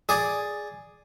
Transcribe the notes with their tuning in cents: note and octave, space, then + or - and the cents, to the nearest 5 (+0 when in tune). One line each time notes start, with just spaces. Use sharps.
G#4 +0 D5 +0